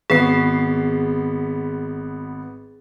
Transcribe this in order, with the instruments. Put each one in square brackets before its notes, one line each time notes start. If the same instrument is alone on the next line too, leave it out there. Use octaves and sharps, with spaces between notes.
[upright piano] G#1 B3 C7 [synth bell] G#4